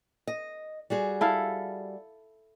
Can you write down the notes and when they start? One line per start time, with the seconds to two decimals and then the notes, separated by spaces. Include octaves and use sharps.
0.27 D#5
0.90 G3 F#4 G#4
1.21 E4 A4 F5